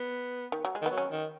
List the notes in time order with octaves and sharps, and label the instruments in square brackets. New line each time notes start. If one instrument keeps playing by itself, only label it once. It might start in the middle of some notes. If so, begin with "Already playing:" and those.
Already playing: [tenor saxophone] B3
[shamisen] D#3
F#3
G#3
[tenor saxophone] D#3
[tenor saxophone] F#3 [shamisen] B3
[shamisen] C#4
[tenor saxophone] D#3